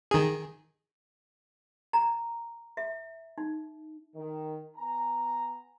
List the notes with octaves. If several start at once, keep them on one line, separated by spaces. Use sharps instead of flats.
D#3 G#4
A#5
E5
D#4
D#3
B3 G#5 A#5